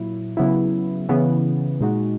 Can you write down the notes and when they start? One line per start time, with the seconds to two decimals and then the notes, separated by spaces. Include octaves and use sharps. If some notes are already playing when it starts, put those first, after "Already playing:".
Already playing: A#2 F#3 A#3 E4
0.37 C#3 F#3 B3 E4
1.09 C#3 E3 B3
1.80 A#2 G#3 D#4 F#4